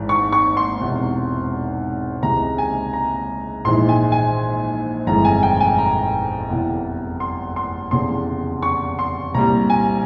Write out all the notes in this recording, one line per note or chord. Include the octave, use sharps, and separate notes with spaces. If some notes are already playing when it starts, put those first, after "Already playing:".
Already playing: G#1 G#2 E3
C#6
C#6
C6
E1 E2 C3
C#2 C3 E3 G#3 A#5
G#5
A#5
A#1 G#2 E3 G#3 C6
G#5
G#5
G1 F2 E3 G#3 A#5
G#5
G5
G#5
A#5
F1 E2 E3
C6
C6
F1 E2 C#3 C6
C#6
C6
C2 A#2 G3 A#5
G#5